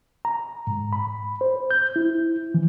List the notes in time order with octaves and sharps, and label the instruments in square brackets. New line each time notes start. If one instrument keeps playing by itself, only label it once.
[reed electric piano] A#5
G#2
B5
C5
G6
E4
E3